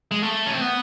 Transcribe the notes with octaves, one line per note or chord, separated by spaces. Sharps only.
G#3
A3
C#4
C4
B3